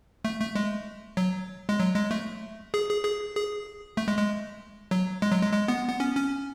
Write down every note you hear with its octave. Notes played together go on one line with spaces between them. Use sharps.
A3
A3
G#3
F#3
G#3
F#3
G#3
A3
G#4
G#4
G#4
G#4
A3
G#3
G#3
F#3
G#3
F#3
G#3
G#3
B3
B3
C#4
C#4